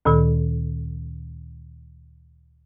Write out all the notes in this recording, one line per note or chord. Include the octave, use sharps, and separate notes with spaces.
D2 A#2 D#3 A4